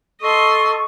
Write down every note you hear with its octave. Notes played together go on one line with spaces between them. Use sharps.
A4 D#5 C6 C#6